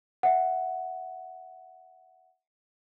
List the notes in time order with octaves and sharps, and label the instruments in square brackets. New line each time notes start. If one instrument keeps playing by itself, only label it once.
[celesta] E5 F#5